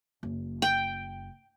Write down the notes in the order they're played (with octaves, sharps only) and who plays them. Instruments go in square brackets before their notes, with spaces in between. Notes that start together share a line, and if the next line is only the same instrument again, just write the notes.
[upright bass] F#1
[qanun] G5